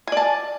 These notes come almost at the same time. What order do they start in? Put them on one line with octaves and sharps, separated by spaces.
G#5 D5 A5